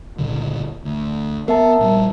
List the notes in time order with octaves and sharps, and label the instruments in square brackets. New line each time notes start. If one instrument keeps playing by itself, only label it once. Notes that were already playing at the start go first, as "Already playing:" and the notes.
[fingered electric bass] C#2 A#2 D3
D2
[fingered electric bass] B3 [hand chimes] A#4 E5 A5
[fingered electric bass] A#1 G3